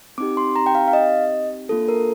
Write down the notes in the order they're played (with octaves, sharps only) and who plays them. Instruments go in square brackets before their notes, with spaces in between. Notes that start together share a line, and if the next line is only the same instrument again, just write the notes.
[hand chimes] C4 D#4 G4 D6
C6
A#5
G5
F5
F5
D#5
A#3 D4 F4 A4
A#4